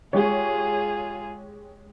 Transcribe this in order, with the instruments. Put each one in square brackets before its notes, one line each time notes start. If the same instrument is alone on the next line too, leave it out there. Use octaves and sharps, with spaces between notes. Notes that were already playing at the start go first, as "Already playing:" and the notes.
[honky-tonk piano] G#3 G4 C#5 [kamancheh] F4 G#4